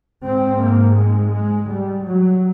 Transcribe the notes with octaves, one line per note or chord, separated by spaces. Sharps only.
G#2 C4
A#3
G#3
G#3
G3
F#3